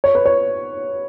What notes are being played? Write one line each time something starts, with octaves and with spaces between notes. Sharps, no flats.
C#5
B4
C#5